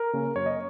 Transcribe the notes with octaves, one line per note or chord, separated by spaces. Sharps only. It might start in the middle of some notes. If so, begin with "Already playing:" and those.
Already playing: A#4
C#3 A#3 C#4
F#2 C#5
D#5